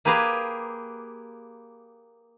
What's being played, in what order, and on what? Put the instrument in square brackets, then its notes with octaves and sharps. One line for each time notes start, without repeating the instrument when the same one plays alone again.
[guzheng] A#3 G4 G#4 B4 F5 A#5